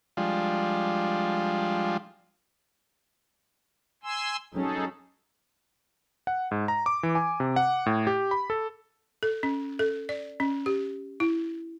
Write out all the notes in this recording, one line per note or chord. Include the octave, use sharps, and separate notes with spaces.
F3 G3 G#3 D4 F4
G#5 C6 E6
F#3 C#4 D#4 G#4 A4
F#5
G#2
A#5
D6
E3
G#5
C3
F#5
A2
G4
B5
A4
A4
C#4
A4
D5
C#4
G4
E4